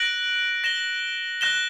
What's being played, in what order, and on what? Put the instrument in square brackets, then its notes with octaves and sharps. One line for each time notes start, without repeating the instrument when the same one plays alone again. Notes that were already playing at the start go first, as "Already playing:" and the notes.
Already playing: [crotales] F#6 A#6 D7 F#7
A#6 E7 G7
F#6 A#6 E7 G7